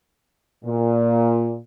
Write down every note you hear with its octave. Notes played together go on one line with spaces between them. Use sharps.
A#2